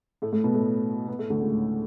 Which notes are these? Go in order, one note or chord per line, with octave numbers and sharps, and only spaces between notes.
A2 A3
A2 A3
B2 B3
A2 A3
B2 B3
A2 A3
D2 D3
C#2 C#3
A2